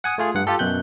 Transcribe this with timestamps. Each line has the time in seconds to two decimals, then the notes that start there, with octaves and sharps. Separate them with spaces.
0.04 F#5 G#5 D#6
0.18 A3 F4 G#4
0.35 G2 F#5
0.47 F4 G4 A4
0.59 F#2 B2 F#6 G6